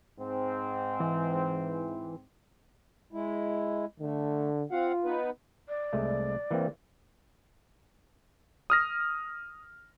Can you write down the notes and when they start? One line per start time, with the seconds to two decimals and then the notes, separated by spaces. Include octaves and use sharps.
0.20 G#2 C4
1.00 E3
3.13 G#3 E4
4.00 D3 A3
4.71 C4 F4 F5 F#5
5.04 B3 D#4 B4
5.69 D5
5.93 C2 G#3 A3
6.51 E3 A#3 C4
8.70 D#6 F6 A#6